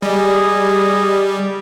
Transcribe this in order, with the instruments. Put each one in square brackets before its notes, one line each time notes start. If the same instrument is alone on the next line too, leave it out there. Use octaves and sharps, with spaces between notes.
[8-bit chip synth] G3 [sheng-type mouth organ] G#4 D#5